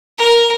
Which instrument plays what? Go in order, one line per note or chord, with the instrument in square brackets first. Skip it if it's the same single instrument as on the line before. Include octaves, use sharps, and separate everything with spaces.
[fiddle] A#4